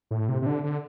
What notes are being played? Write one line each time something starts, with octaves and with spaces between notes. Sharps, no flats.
A2
C3
C3
D3
D3